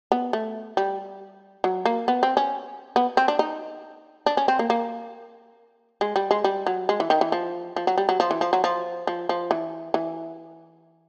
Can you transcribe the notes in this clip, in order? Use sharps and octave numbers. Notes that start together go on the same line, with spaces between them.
B3
A3
G3
F#3
A#3
B3
C4
C#4
B3
C4
D4
D#4
D4
C#4
C4
A#3
A#3
G#3
G3
G#3
G3
F#3
G#3
E3
D#3
E3
F3
F3
F#3
G3
F#3
F3
E3
F3
F#3
F3
F3
F3
E3
E3